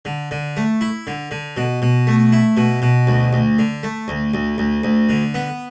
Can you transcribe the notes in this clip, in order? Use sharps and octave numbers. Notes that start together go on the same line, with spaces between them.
D3
D3
A3
E4
D3
D3
B2
B2
A3
E4
B2
B2
D2
D2
D3
A3
D2
D2
D2
D2
D3
B3